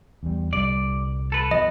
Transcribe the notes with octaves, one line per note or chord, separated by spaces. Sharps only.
E2 G3
C2 D3 G3 D5
A4 B4
F3 B3 D#5